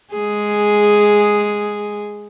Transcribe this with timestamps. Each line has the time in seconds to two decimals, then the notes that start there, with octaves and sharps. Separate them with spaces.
0.12 G#3 G#4